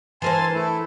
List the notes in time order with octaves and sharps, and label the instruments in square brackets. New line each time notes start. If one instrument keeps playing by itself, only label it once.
[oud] E3 A#4 C5 [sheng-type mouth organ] G#5 A5 C6
[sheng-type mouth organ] A3 E4